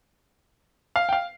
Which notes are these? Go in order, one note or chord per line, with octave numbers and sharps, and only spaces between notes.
F5
G5
F5